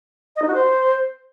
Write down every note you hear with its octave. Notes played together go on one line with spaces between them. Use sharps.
D#5
D#4
F#4
C5